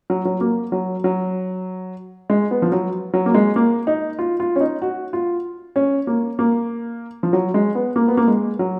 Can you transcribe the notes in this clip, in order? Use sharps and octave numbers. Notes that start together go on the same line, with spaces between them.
F#3
F#3
A#3
F#3
F#3
G#3
B3
F3
F#3
F#3
A#3
G#3
A#3
D#4
F4
F4
C#4
D#4
F#4
F4
C#4
A#3
A#3
F3
F#3
G#3
B3
A#3
B3
A#3
G#3
F#3